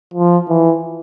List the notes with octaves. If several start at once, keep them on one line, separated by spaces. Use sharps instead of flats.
F3
E3